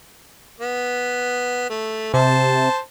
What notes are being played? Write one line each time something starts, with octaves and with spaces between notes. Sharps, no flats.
B3
A3
C3 C5 A5